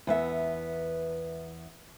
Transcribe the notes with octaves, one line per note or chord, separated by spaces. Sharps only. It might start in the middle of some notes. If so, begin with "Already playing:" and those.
E2 B3 E5